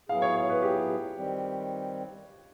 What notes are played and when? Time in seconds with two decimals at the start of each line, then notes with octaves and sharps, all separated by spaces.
0.09 A2 F#3 B3 E4 G#4 F5
0.22 C#5
0.36 C#5
0.50 B4
0.63 G4
1.16 D#3 G3 C4